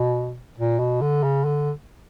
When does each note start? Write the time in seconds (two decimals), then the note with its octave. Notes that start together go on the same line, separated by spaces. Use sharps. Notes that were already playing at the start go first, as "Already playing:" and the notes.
Already playing: B2
0.58 A#2
0.79 B2
1.01 D3
1.23 C#3
1.45 D3